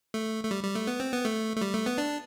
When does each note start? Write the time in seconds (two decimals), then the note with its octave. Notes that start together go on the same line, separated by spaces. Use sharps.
0.14 A3
0.44 A3
0.51 G3
0.63 G3
0.75 A3
0.87 B3
1.00 C4
1.13 B3
1.25 A3
1.57 A3
1.61 G3
1.74 A3
1.86 B3
1.98 D4